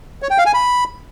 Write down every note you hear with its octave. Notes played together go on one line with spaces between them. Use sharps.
C#5
G5
F5
G#5
B5